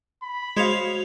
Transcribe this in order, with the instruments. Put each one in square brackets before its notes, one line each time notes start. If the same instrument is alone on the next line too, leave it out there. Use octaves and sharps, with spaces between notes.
[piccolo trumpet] B5
[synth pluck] G#3 D#5 G#6 [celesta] F#4 [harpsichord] C5 C#5 F5